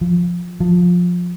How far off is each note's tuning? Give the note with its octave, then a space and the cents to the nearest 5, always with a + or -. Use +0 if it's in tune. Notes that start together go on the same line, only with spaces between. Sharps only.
F3 +5
F3 +20